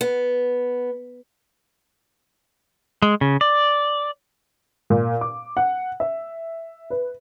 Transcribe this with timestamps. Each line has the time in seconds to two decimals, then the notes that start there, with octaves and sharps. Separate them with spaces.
0.01 B3
3.02 G#3
3.21 C#3
3.41 D5
4.90 A#2
5.21 D6
5.57 F#5
6.00 E5
6.90 B4